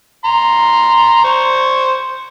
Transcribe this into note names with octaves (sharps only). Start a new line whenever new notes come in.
A#5 C6
C5 C#6